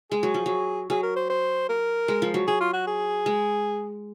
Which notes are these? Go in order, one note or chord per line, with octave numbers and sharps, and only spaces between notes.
G#3 G#4
F#3
F3
F#3
F#3 G#4
A#4
C5
C5
A#4
G#3
F3
F#3
F#3 G#4
F4
F#4
G#4
G#3